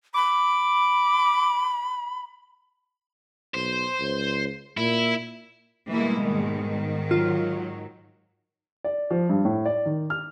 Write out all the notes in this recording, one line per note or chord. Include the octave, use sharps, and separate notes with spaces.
B5 D6
B1 C5
C#2
A#2 E4
B2 E3 G3 G#3 A#3 E4
G#2 D#3
F#3 F4
D5
F3
G2
A2
D5
D#3
F6